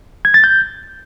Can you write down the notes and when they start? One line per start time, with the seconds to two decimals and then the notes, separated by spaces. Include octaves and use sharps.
0.25 G#6
0.34 A6
0.44 G6